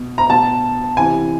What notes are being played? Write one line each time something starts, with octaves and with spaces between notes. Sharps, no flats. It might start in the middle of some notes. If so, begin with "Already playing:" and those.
Already playing: B2
A#5
B2 A5
C3 E3 G#5